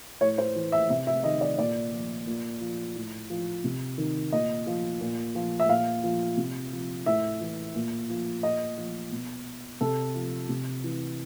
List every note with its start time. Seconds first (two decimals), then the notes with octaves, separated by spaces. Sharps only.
0.21 A2 C#5
0.38 C5
0.55 E3
0.72 E5
0.90 C3 E5
1.07 E5
1.24 D#3 D#5
1.41 D5
1.58 A#2 D5
1.92 F3
2.27 A#2
2.61 F3
2.95 A2
3.30 F3
3.64 C3
3.98 D#3
4.32 A#2 D#5
4.67 F3
5.01 A#2
5.35 F3
5.60 E5
5.69 A#2 F5
6.04 F3
6.37 C3
6.72 F3
7.06 A2 E5
7.41 E3
7.75 A#2
8.10 F3
8.43 A#2 D#5
8.77 F3
9.12 B2
9.81 C3 A4
10.15 F3
10.49 C3
10.84 E3